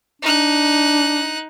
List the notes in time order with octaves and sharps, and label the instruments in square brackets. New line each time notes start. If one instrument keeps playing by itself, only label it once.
[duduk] D4 [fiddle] D#4 F#6